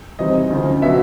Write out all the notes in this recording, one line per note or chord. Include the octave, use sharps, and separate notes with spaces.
C3 E3 G3 C4 D#4 D#5
D2 C#3 F3
B2 F#3 B3 E5